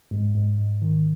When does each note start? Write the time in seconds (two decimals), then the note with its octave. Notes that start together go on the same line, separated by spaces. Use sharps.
0.11 G#2
0.35 G#2
0.58 G#2
0.82 D#3